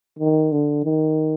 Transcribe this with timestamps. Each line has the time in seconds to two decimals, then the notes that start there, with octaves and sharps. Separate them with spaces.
0.19 D#3
0.52 D3
0.84 D#3